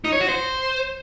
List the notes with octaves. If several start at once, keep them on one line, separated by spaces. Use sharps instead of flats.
D#4
C#5
F#4
C5